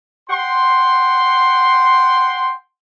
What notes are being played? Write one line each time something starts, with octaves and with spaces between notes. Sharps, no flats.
F#5 G5 C6